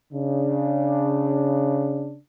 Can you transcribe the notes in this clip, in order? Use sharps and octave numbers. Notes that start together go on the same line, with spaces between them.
C#3 D4